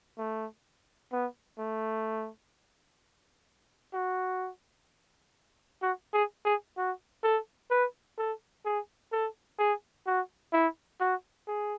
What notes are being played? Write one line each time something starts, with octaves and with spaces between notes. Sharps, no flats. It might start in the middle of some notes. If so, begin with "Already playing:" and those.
A3
B3
A3
F#4
F#4
G#4
G#4
F#4
A4
B4
A4
G#4
A4
G#4
F#4
E4
F#4
G#4